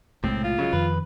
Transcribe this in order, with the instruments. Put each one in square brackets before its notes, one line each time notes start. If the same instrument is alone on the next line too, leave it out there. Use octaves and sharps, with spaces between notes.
[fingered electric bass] B1 C3 G#3 [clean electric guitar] A2 [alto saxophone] C4
[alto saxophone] F4
[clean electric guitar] C#3 F#3 G#3
[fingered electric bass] F2 D#3 F3 [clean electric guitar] B4